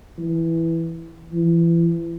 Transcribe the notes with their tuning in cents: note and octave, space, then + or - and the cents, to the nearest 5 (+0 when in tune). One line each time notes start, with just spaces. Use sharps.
E3 +0
E3 +30